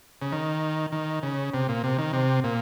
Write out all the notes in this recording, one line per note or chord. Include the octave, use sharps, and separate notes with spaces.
C#3
D#3
D#3
C#3
C3
A#2
C3
D#3
C3
A#2